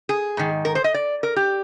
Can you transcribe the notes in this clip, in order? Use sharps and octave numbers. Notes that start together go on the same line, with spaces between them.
G#4
G#2 D#3
A#4
C5
D#5
D5
A#4
G4